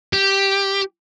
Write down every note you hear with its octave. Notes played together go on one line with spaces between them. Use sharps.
G4